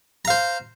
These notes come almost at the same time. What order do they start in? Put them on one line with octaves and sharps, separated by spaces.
A#5 F5 C5